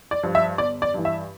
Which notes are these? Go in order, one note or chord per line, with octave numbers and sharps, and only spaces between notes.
D5
G2 F3
E5
G1 D5
D5
G2 E3
E5